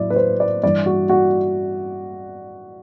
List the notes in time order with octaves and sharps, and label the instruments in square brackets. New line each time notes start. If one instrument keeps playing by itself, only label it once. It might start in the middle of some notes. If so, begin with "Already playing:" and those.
Already playing: [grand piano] A2 F#3 E4 D5
B4
C5
D5
G2 E3 G3 D5
F#4
F#4